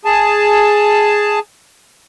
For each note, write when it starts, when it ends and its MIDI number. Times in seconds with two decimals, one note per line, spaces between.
0.05 1.39 68
0.05 1.39 81